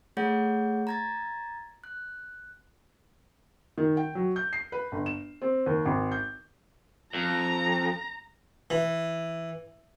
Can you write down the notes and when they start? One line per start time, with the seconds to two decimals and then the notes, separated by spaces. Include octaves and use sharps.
0.17 A3 G#4 C#5 F#5 G6
0.87 A#5 G#6 A6
1.84 F#6
3.78 D#3
3.97 G5
4.15 F#3
4.36 G6
4.53 C7
4.72 B4
4.92 G1
5.06 E7
5.42 C4
5.66 D#2
5.86 G#1
6.12 G6
7.14 F2 A#5
8.70 E3